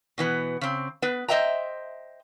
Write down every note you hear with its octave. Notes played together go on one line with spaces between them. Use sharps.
B2 E3 B3
C#3 C4
B3 B4
C5 D#5 E5 G5 A#5